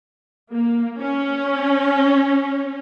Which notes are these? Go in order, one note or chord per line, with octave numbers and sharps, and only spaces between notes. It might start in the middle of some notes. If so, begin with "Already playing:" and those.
A#3
C#4